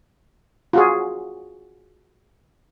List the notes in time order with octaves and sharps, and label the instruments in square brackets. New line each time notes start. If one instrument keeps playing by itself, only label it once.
[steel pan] F4 F#4 G#4